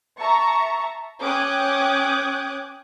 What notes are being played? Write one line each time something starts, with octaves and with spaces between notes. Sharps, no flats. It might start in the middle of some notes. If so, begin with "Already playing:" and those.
E5 A5 A#5 C#6
C#4 G5 D6 D#6 F#6 G#6